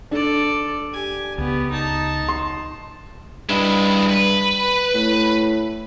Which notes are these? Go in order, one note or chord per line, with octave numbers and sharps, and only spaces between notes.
D4 A4 D5
G4 G#5
C#2 B3 G4
D#4 A5
C6
G2 G#3 E4
B4
A2